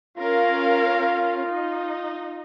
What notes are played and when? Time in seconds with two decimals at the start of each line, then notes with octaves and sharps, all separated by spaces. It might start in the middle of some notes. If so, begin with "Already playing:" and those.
0.18 C#4 F4 A#4 F5
1.47 D#4